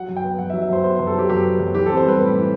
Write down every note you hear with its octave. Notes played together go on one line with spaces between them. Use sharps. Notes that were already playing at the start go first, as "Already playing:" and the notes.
Already playing: F#3 F#5
F#2
G5
B3
F#2 F#5
E5
F#3
E5
F#2 C5
B3 C5
F#2 C5
A4
F#3 G4
F#2 G4
B3
F#2
E3 G4
C4 A4
C5
G3 B4
A2
E3